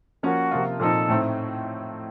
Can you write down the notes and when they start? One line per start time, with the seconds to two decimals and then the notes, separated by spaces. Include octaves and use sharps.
0.23 F3 A#3 C#4 F#4
0.51 C3 F3 A#3 F4
0.80 A#2 F3 C4 D#4 A4
1.09 A2 A3 C4 D#4